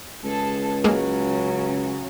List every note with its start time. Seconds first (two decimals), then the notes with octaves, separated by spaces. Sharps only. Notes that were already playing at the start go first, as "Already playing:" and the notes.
0.24 C#2 G#4 A4 A5
0.84 C#3 F#3 G#3 A#3 C#4